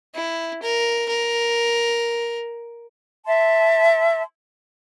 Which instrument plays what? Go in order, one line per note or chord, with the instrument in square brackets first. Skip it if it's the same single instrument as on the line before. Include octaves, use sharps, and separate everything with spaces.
[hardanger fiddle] E4
A#4
A#4
[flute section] E5 A5 C6